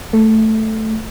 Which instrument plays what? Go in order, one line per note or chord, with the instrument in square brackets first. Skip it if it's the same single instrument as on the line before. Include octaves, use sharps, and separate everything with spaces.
[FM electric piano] A3